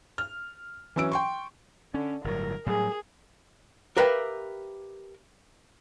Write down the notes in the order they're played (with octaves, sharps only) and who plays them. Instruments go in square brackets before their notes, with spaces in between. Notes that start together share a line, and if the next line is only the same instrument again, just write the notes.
[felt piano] F6
E3 F#3 C#4 E6 D7
G5 C6 C#6
[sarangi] D3 [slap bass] C#4
[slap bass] G1 A2 F#3 [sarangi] A#4
[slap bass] A2 F#3 G3 [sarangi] G#4
[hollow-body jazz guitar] G4 A#4 B4 E5 F5 G5